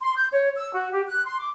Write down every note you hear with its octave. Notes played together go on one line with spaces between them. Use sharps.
C6
G6
C#5
E6
F#4
G4
F#6
C6
D6